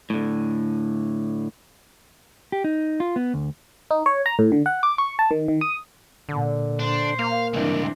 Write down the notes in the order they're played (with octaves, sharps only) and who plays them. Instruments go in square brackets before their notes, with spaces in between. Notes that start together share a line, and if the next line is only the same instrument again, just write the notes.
[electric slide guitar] A2 D3
[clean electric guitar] G4
D#4
F4
B3
D2
[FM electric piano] D#4
C#5
A#5
A2
D3
F#5
D6
C#6
A5
D#3
D#3
D#6
[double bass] A#2 [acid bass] D3
[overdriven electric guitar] D4 [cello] C5
[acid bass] A#3 [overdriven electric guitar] F5
[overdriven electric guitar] C#2 G2 [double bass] E3 [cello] C4 D4